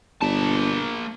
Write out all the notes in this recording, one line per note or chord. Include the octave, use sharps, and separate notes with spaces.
G1 A#3 A5